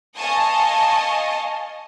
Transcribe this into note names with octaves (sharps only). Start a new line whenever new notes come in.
D#5 F5 G#5 A5 C#6 D#6